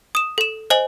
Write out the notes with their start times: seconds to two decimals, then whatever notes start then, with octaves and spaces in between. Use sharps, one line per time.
0.15 D#6 E7
0.38 A4 E7
0.70 C5 D#5 G#5 F#7